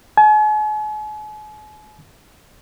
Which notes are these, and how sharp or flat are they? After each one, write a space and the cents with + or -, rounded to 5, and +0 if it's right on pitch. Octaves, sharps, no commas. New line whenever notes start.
G#5 +45